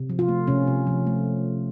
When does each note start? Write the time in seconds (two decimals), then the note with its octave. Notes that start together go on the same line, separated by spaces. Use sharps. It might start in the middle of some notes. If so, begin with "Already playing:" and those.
Already playing: C3
0.10 F3
0.19 F4
0.28 A3
0.47 C3 C#4
0.67 C3
0.87 F3
1.07 A3